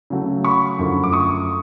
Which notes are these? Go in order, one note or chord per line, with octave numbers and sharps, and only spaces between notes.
C#3 F#3 A3
B5 C#6
F#2 D3 F3 A3
D6
C#6 D#6